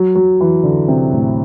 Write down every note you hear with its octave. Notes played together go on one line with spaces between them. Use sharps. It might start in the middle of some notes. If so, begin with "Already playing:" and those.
Already playing: F#3
F#3
E3
D3
C3
A2